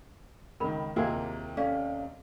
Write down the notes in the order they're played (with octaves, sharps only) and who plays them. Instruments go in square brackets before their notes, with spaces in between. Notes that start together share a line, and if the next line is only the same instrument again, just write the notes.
[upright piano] C#2 D#3 [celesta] A#4 B5
[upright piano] D#2 C3 A#3 [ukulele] E4 F4 G#4 [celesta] A#4
[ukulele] C#4 [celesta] A4 D5 F5